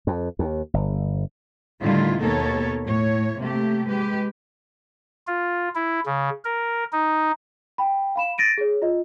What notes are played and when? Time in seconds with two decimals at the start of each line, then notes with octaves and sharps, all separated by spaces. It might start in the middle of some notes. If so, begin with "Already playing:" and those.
0.07 F2
0.39 D#2
0.74 G1
1.80 A2 D3 D#3 G3 E4 F4
2.19 D#2 B2 B3 A4 A#4 C#5
2.84 A2 C#5
3.38 C3 A3 A#3 G4
3.86 G#3 G4 B4
5.27 F4
5.75 E4
6.06 C#3
6.45 A#4
6.92 D#4
7.78 G5 B5
8.16 F5 B5 E7
8.38 A6 A#6 D7 D#7
8.58 G#4 C#5
8.82 F4 D#5